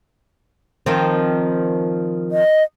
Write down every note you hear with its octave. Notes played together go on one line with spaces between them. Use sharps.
D#3 F3 C4
D#5